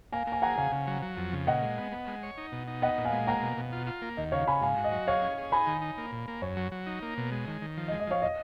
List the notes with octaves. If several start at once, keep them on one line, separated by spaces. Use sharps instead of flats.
A#3 F5 G#5
A#3
G#5
G#4 F#5 A#5
C#3 F5 G#5
C#3
F#3
F#3
F2
C#3
A#2 D#5 F#5
G#3
B3
B3
G#3
C#5
D#4
B2
D#4
B3 D#5 F#5
A#2
F5 G#5
G#3
A#3 F#5 A#5
B2
B2
F4
F4
A#3
D#2 D#5
C#3 C#5 F5
C#3 G#5 B5
G#2 F5 G#5
F#4
D#5
F#3
G#4 C#5 F5
C#4
G#4
D#4 G#5 B5
D#3
D#4
A#3
A#2
A#3
F#2 C#5
F#3
F#3
D#4
A#3
B2
G#3
D#3
D#3
F3
D#5
G#3
D#5
F3 C#5 F5
D#5